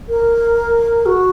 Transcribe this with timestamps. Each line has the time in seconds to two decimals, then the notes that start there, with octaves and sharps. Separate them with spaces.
0.09 A#4
1.06 F#4